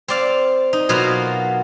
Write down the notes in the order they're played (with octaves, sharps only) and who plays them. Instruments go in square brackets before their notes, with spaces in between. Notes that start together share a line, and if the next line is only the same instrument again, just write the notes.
[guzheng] C4 D5 F5
D#4
B2 F#3 A#3 B3 F4